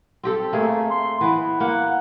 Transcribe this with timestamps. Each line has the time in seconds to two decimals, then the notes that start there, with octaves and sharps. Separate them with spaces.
0.23 C4 G4 A4
0.53 A3 A#3 G#4
0.90 C6
1.21 E3 B3 F#5
1.60 A#3 F#5